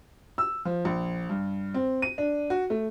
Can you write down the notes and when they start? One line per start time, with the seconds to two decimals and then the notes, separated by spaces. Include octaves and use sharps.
0.38 E6
0.65 F3
0.85 A#1
1.29 G2
1.74 C4
2.02 D#7
2.18 D4
2.50 F#4
2.70 A3